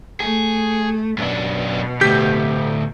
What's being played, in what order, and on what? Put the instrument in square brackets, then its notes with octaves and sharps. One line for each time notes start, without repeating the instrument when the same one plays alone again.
[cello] A3 [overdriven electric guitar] G#4
[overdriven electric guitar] F#2 D4 [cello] B2
[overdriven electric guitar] D2 A2 [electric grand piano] G4 G6 B6